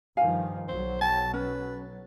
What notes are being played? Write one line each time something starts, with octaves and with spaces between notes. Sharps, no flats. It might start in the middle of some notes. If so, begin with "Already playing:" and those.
G2 D#3 F3 F5 G#5
B1 F#3 C5
G5 A5
C#4 B4